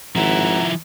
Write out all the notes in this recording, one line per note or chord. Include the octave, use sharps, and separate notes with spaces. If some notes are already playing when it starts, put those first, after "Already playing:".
G#1 F3 E4 F#5 A#5